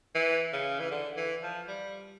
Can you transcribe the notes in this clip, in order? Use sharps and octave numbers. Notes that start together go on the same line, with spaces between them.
E3
C#3
E3
D3
E3
F3
G3